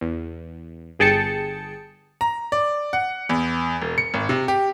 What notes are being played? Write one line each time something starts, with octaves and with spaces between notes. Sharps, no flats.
E2
G1 G#4 G5 A5 A6 C#7
A#5
D5
F#5
E2
E1
C#7
G#1
C3
G4